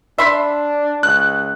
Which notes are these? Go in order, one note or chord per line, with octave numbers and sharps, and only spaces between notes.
D4 E5 B5 C6
C#2 F#6